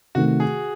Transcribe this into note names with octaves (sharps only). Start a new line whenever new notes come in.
C3 D#3 A3 F#4
G#4